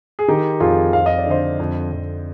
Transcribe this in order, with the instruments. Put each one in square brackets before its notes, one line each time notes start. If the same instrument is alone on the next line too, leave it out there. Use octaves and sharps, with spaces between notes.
[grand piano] G#4
D#3 D#4 G4
F2 F4 G#4
F2 F5
D#5
D5
D3 C5 D#5
F2
F2